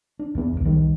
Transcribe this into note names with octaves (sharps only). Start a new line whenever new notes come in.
D4
E2 B3
G1 C#2
C2 D#3 G3